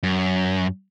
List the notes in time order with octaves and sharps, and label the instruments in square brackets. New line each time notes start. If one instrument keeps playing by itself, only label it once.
[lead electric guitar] F#2